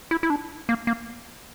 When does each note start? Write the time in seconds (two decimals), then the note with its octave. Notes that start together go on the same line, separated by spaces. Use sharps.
0.11 E4
0.23 E4
0.30 D4
0.69 A#3
0.87 A#3